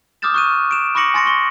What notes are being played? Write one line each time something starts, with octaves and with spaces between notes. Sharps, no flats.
D6 D#6 F6 G6 A6 E7
C#6 F#6 D#7
D7 E7
B5 C#6 D6 A#6 C#7 F#7
G#5 C6 A6 A#6 C#7
C#6 G7